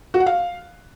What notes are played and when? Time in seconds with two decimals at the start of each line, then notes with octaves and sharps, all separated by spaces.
0.14 F#4
0.20 F#5
0.26 F5